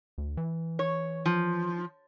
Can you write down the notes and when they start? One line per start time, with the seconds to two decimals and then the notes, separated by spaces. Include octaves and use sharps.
0.18 D2
0.37 E3
0.79 C#5
1.26 F3